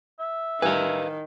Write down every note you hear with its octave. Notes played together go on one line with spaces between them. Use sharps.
E5
A1 D#3 G3 B4 F5 G#5